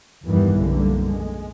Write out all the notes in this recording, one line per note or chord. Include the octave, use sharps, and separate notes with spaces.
E2 G2 D#3 E3 G3 B3
B1 F#2 D3 G3 A#3
G#3